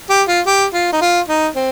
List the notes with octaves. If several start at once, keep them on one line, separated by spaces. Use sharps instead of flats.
G4
F4
G4
F4
D#4
F4
D#4
C4